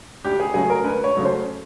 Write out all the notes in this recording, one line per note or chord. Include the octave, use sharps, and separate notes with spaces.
D2 G4
G#4
C#3 F#3 A3 G#4
A#4
D2 B4
C#5
C#3 F#3 A3
C5